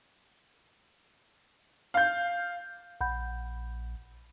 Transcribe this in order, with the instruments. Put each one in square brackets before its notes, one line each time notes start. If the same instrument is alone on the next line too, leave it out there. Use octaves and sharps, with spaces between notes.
[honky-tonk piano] F5 G6
[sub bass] A#1 [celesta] F#5 B5 G6